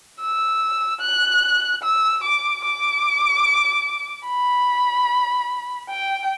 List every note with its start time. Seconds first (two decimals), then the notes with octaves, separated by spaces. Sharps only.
0.20 E6
1.01 F#6
1.83 E6
2.24 D6
2.65 D6
4.27 B5
5.90 G5